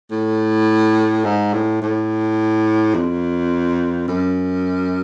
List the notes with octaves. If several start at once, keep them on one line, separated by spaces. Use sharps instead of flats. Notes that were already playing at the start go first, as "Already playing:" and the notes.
A2
G#2
A2
A2
F2
F#2